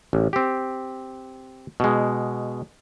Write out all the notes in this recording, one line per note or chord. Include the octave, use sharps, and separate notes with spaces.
A1
C4 G4
B2 G#3